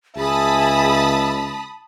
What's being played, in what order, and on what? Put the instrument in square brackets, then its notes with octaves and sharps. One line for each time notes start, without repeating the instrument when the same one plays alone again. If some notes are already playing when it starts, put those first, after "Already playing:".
[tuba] C#2 [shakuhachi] G#4 [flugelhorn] E5 [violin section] A5 B5 D#6